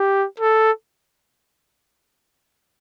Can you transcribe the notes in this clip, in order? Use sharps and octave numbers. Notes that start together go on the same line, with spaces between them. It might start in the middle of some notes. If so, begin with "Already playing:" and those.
Already playing: G4
A4